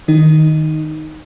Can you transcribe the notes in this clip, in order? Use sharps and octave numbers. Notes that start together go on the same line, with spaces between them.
D#3 D#4